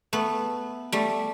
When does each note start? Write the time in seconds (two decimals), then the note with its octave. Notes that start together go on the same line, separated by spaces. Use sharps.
0.13 A3 B3
0.92 G3 A3